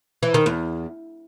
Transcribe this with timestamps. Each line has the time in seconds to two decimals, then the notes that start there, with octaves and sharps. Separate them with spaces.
0.23 E3
0.34 D#3
0.46 E2